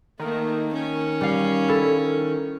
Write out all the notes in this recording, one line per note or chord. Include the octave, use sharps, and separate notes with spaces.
D#3 A3 A#3
C#4
G3 F5
E4 A4